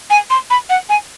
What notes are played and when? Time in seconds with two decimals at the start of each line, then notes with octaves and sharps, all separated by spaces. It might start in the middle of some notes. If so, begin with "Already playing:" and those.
0.10 G#5
0.30 C6
0.50 B5
0.70 F#5
0.89 G#5